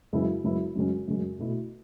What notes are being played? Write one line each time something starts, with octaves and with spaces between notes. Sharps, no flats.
F#2 C#3 G#3 B3 E4
F#2 C#3 G#3 B3 E4
F#2 C#3 G#3 C#4
F#2 C#3 G#3 C#4
B2 A3 E4